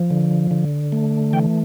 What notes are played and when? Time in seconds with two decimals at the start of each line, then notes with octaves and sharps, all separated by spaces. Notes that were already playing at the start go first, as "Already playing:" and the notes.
Already playing: F3
0.10 D3
0.51 D3
0.92 A3
1.33 E3 G5